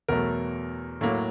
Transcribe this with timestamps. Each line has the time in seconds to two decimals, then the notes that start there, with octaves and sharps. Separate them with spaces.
0.08 E2 B2 F#3 A3 A#4
1.01 A2 F#3 A#3